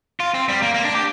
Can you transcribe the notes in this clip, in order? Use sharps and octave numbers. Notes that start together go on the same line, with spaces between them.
F4
C4
G3
A#3
A#3
D4
G4